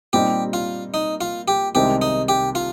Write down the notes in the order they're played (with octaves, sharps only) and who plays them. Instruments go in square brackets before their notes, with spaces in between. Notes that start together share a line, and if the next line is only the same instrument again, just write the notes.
[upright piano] A#2 G3 C4 D#4 [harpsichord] G4
[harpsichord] F4
D#4
F4
G4
[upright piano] C2 C3 D#3 G#3 C4 [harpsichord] G4
[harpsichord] D#4
G4
F4